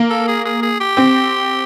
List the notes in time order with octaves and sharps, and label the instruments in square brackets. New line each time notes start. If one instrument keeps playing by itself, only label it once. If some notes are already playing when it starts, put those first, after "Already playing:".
Already playing: [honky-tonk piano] A#3
[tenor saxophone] A4
G#4
G#4
G#4
G4
[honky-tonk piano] C4